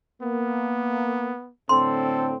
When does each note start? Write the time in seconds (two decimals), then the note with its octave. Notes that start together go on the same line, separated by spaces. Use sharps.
0.22 A#3 B3
1.69 A2 D3 C4 A4 C6